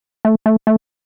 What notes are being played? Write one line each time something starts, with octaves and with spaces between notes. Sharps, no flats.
A3
A3
A3